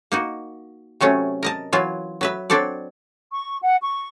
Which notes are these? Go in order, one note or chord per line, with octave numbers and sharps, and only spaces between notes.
A#3 D#4 F#4
C3 F#3 A3 C#4
A#4 D#5 A5
E3 F#3 F4
F#3 B4 E5
F#3 C4 D4 A4 D5
C#6
F#5
C#6